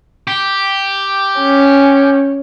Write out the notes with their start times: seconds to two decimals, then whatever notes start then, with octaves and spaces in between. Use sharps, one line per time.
0.28 G4
1.40 C#4